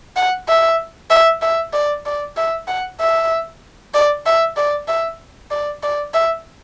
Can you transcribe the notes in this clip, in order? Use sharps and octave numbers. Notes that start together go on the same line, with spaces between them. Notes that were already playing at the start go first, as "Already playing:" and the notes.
F#5
E5
E5
E5
D5
D5
E5
F#5
E5
D5
E5
D5
E5
D5
D5
E5